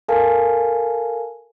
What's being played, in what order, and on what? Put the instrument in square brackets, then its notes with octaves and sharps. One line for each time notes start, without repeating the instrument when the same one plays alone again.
[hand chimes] A4 A#4 F5 G#5 A5